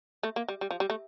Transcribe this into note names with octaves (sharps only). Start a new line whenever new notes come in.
A3
A#3
G3
G3
F3
G3
A3